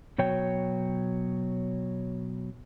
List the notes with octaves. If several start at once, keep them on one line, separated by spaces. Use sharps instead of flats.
B2 F#3 C#5 G5